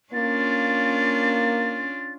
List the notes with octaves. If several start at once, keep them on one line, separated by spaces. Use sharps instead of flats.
A#3 C#4 D4 F4 A6